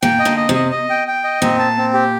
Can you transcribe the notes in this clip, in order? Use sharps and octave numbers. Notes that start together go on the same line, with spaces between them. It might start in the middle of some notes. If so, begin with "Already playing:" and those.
A#2 G5
D#5
A#2 D3
D#5
C3
D#5
D#5
G5
G5
D#5
A#2 C4
A5
C4
G4